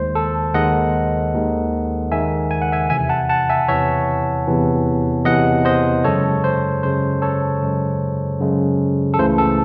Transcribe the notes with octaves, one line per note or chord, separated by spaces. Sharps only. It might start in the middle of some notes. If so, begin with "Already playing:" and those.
Already playing: D#2 D#3 G#3 C5
A4
D#2 D#3 G#3 D#5 F#5
D#2 D#3 G#3
D#2 D#3 G#3 E5 G#5
G#5
F#5
E5 G#5
E2 C3 E3 E5 G#5
F#5 A5
F#5 A5
E5 G#5
E2 C3 E3 C#5 E5
E2 C3 E3
E2 C3 E3 D#5 F#5
C5 D#5
F#2 C#3 G#3 A4 C#5
C5
F#2 C#3 G#3 C5
A4 C#5
F#2 C#3 G#3
F#2 C#3 G#3
A4
C#2 C#3 E3 A3 C5
A4